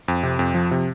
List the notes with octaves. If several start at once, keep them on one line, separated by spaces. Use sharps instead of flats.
F2
C3
F2
F3
C3